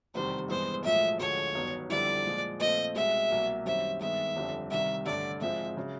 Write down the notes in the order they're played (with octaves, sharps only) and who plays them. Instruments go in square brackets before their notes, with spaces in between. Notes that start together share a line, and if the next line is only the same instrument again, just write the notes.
[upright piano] F1 E2 C3 D#3 G3 [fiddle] C5
[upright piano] G2 E3 G#3 B3 [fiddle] C5
[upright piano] B1 A2 F3 G#3 [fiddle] E5
[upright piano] D2 D3 F3 G#3 [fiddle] C#5
[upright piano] G1 G2 D#3 F#3 B3
[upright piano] F2 D3 G3 C4 E4 [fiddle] D5
[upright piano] A#2 F3 G#3
[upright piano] A#2 F3 A3 C4 [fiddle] D#5
[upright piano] C2 B2 G#3 [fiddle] E5
[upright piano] C2 B2 F#3 A#3
[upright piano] F#2 D#3 G3 C4 [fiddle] E5
[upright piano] G2 D#3 G#3 B3 [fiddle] E5
[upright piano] G1 F2 D3 G3
[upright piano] C2 C3 D#3 G3 [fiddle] E5
[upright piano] A1 G2 D3 [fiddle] D5
[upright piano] G#1 G#2 F3 G#3 C4 [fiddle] E5
[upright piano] C#3 F#3